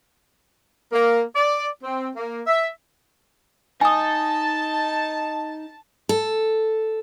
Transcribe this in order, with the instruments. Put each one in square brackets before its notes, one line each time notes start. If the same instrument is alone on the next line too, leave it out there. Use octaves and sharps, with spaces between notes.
[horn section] A#3
D5
C4
A#3
E5
[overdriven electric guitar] D#4 [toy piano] G#5 D#6 [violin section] A5
[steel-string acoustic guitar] A4